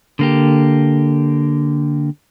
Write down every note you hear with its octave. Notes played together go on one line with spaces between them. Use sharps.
D3 A#3 G4